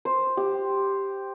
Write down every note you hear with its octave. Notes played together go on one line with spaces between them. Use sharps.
C5
G4